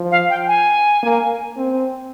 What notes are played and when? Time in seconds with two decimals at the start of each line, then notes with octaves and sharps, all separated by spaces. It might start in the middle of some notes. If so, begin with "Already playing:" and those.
Already playing: F3
0.11 F5
0.30 G5
0.48 G#5
1.03 A#3
1.57 C4